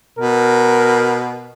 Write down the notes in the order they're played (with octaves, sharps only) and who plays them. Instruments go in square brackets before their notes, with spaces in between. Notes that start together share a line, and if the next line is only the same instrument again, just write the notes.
[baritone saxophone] B2 [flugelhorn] A#4